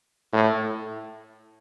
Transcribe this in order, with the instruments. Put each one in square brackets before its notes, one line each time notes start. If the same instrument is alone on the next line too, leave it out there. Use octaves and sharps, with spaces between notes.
[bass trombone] A2